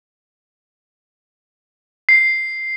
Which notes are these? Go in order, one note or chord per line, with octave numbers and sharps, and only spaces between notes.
C7